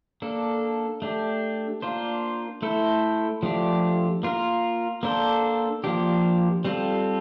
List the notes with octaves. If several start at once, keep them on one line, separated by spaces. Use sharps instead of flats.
A#3 D4 A4
A3 D4 G4
A#3 D4 F4 C5
A3 E4 A4 C5
F3 A3 D4 G4
A#3 F4 A#4
A#3 D4 A4 C5
F3 A#3 D4 G4
G3 C4 F4 A4